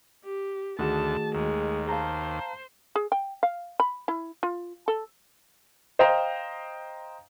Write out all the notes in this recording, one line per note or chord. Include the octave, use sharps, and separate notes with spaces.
G4
D2 D#3 A3 F#4 G#4 A5
D#2 G#3
C5 F5 A5 A#5
G#4
G5
F5
B5
E4
F4
A4
C5 D#5 F5 G5 A#5